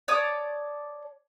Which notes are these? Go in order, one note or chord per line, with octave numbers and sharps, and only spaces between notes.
C#5 D5 A5 D#6